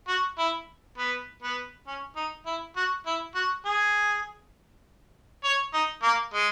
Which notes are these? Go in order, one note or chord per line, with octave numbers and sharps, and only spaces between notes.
F#4
E4
B3
B3
C#4
D#4
E4
F#4
E4
F#4
G#4
C#5
D#4
A#3
G#3